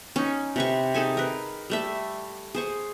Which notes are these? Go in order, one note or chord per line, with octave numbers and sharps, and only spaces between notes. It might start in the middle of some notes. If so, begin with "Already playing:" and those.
C#4 D#4
C3 B4 C#6
D#4 G#4 A4 G#5
A#4 B4
G3 A3 E5
G#4 C5 C#6